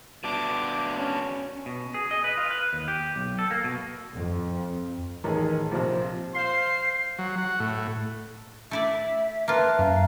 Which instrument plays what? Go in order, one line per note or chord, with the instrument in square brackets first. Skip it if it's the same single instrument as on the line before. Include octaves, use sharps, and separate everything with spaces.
[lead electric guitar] B2 D4 [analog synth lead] D6
[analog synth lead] C#4
[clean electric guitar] B2
G#4
D#5
B4
F4
B4
D#2
G4
B1
A4
A#3
B2
[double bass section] F2
[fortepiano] A1 G#4 [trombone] D#3
[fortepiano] A#1 C3 [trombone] F3
[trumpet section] C5 F5 C6 [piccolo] C7
[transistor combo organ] F#3
F#4
A2
[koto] A3 E4 D5 [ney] E5
[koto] A#3 F4 [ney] B4 [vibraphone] E5 A5 A#5
[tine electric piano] F#2 [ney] F5